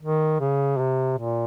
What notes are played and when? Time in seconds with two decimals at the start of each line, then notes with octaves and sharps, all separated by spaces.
0.01 D#3
0.40 C#3
0.79 C3
1.18 A#2